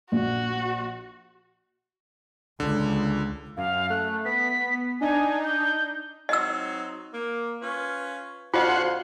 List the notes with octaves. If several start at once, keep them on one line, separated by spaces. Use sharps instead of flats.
A#1 F#4
C#2 D3
F#2 F5
A3 F#6
B3 B6
D4 D#4 G#5
G6
F#3 C4 D#4 D#5 E6
A#3
C#4 F4 B4
F2 D3 F4 F#4 C5 D#5 F5 F#5